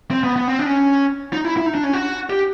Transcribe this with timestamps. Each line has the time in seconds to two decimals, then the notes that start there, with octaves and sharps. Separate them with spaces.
0.11 C4
0.24 B3
0.36 B3
0.48 C4
0.59 D4
0.66 C#4
1.33 D#4
1.45 E4
1.57 E4
1.66 D#4
1.75 D4
1.84 C#4
1.93 F#4
2.30 G4